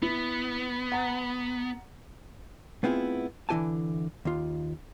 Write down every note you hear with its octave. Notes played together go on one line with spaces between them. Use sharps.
B3 E4
F#5 A#5
A3 B3 C4 E4 F4 G#4
D3 E3 E4 G4 G#5 A5
D#2 F4